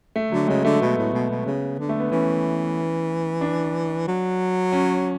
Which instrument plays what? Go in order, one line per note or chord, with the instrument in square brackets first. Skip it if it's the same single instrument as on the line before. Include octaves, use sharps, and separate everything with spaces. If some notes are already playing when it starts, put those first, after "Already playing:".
[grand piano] A3
[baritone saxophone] D3 [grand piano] F#3
[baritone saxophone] C#3 [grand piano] G#3
[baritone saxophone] D3 [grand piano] A3
[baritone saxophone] B2 [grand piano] B3
[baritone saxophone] A2
B2
B2
C#3
D3
[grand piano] A3
B3
[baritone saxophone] E3 [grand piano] C#4
[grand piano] D4
[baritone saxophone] F#3
[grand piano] C#4